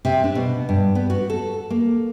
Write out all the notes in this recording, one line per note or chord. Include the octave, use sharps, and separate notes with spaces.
C3
D4
B2
G2
B3
F#4
A4
A#3